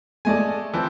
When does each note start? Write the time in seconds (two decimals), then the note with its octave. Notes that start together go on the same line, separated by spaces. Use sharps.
0.25 G#3 A3 A4 D5 D#5 G#5
0.74 E3 F3 C4